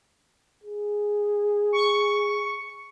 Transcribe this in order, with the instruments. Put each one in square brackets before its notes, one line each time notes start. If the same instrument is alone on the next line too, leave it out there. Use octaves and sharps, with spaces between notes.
[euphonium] G#4
[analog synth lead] C#6